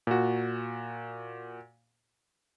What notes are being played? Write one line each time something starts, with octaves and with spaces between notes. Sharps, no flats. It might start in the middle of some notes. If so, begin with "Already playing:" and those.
A#2 F#4